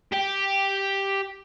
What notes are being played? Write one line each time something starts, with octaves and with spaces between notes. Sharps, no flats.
G4 G5